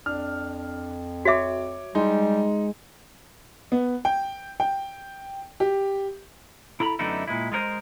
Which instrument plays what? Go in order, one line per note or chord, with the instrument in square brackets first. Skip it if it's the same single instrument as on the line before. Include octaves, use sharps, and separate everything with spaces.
[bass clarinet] F2 [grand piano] D4 F6
[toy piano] F#4 E5 [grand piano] C#5 D6
[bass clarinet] G3 [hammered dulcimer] G#3 [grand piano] D#4
[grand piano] B3
G5
G5
G4
[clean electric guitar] E4 A4 A#5 B5
F#2 D3 A3 B3 D#4 E4
A#2 G#3 E4
G#3 F4 A#4 C5 D#5